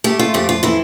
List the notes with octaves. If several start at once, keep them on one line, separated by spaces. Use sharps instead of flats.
A3 G4
F4
F2 G4
F4
E3 E4